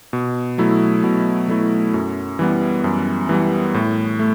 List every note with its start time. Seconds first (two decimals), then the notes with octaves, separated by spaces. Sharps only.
0.13 B2
0.58 F#3 A3 E4
1.04 B2
1.48 F#3 A3 E4
1.94 F#2
2.39 E3 G3 B3
2.84 F#2
3.29 E3 G3 B3
3.74 A2
4.19 A3